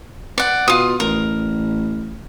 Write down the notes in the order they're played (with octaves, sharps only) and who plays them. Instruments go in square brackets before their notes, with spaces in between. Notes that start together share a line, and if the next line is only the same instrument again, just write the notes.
[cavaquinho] D5 F#5
[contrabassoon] B2 [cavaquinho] F4 D#6
[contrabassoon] A1 [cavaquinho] A#4